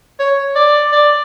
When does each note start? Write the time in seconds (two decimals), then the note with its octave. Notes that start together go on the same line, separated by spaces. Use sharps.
0.19 C#5
0.56 D5
0.92 D5